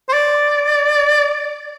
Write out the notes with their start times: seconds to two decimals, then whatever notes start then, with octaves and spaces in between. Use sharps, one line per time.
0.09 C5
0.13 D5